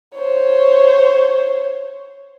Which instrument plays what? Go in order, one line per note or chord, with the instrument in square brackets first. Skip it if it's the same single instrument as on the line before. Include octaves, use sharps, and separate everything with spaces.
[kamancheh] C5 C#5